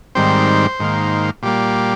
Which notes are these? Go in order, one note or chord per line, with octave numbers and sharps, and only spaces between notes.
G#2 D#3 G3 C4 C5
G#2 D#3 A#3
A#2 G3 A#3 G4